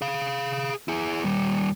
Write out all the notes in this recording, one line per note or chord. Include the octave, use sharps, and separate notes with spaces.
G#4 F5
E4 G#4
D#2 G3